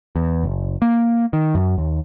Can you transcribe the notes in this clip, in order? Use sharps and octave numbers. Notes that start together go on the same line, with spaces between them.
E2
F#1
A#3
D#3
F#2
D#2